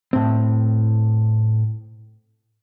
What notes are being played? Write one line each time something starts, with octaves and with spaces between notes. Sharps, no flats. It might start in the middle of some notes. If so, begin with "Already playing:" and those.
A2 C4